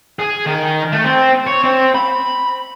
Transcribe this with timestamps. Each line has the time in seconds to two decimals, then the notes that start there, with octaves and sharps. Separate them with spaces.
0.19 G#4
0.46 D#3
0.92 A3
1.04 C4
1.47 C#5
1.64 C4
1.95 B5